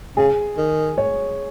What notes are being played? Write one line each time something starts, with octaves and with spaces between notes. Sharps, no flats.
C#3 G#4
D#3
C#5